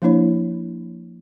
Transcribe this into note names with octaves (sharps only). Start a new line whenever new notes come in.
F3 A#3 D4 E4 C#5